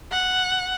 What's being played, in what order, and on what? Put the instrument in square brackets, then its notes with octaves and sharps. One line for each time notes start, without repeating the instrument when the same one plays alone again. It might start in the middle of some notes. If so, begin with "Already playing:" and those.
[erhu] F#5